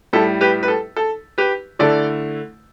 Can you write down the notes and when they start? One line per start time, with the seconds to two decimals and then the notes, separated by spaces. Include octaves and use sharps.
0.13 A2 G3 E4 A4
0.41 G4 B4
0.63 B4
0.68 A4
0.96 A4
1.38 G4 B4
1.79 D3 A3 E4 A4 D5